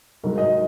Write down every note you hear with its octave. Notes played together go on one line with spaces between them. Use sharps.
G#2 F#3 A#4
D#5